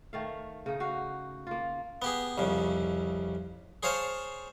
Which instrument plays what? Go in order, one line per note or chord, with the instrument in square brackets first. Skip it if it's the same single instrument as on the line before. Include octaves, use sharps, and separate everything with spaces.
[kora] D#3 A3 F5
C#3 D#4
F#4 F5
A#3 F4
[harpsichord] B3 G4 G#4
C2 F2 C#3
G#4 C5 C#5 F5 G#5 A5